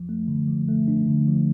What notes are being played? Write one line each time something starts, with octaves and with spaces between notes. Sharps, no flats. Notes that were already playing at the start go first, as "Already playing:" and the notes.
Already playing: F3
A3
D3
F3
A3
D4
D3
F3